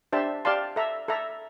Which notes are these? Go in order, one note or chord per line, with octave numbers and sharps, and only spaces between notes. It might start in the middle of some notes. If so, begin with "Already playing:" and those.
D4 G4 C5 E5 A5
G4 D5 F5 A5 C6
A4 E5 A#5
A4 E5 A#5